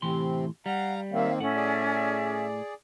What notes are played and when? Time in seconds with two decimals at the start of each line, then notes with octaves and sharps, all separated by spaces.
0.02 A2 C3 E3 C4 C6
0.66 G3 F5 F#5 A#5
1.12 D#3 A#3 C4 C#5 E5 F5
1.40 A2 C#4 A4 E5 F#5
1.56 G#4 D5